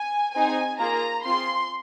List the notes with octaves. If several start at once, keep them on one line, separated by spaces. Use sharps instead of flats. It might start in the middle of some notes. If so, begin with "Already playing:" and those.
Already playing: G#5
C4 D#4 G#4 G#5
A#3 F4 G#4 A#5
C4 F4 G#4 C6